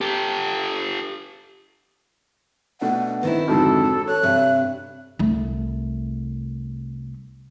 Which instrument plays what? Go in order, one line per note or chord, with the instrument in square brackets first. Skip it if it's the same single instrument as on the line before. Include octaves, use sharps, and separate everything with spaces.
[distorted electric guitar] G4 A4
[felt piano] B2 A3 D4 [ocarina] F#5
[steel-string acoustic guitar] D#3 C4 E4 [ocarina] B4
[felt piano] F2 G#2 D3 [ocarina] F#4 [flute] A4
[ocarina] A4 [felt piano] C#5 [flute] F#6
[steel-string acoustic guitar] G2 C3 [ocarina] E5
[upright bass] C2 A3